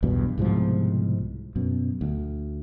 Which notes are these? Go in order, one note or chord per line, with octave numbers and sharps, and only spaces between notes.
B1 E2 G2 B2
C2 G#2 B2 F3
F#2 B2
D2